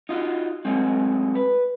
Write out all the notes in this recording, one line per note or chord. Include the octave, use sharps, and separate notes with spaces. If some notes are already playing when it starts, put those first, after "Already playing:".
D#4 F4 F#4
F#3 G#3 A3 C4
B4